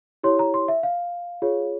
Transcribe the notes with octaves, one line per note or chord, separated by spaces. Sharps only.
E4 G4 C#5 C6
A#5
C6
E5
F5
F4 G#4 C#5